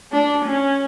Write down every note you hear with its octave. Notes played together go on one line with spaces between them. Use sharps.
D4
C#4